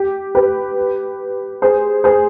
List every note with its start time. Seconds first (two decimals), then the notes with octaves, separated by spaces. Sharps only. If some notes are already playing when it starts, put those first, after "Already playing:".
Already playing: G4
0.35 G4 B4
1.62 G#4 C5
2.04 G#4 C5